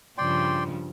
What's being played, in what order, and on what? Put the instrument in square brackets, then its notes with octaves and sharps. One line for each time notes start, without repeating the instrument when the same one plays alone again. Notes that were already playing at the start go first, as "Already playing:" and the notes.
[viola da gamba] G2 C#3 F3 [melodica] D5 G5 C6